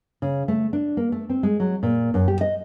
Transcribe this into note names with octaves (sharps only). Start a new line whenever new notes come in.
C#3
A3
D4
A#3
A3
C4
G#3
F#3
A#2
F#2
G4
D#5